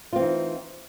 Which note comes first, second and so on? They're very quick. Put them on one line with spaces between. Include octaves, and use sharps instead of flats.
F4 C4 E3 D#4